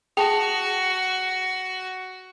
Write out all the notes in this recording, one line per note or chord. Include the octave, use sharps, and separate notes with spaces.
F#4 G#4 G5 A5